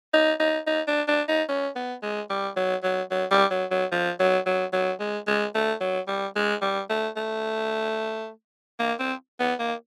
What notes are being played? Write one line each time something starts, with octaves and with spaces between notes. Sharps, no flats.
D#4
D#4
D#4
D4
D4
D#4
C#4
B3
G#3
G3
F#3
F#3
F#3
G3
F#3
F#3
F3
F#3
F#3
F#3
G#3
G#3
A3
F#3
G3
G#3
G3
A3
A3
A#3
C4
B3
A#3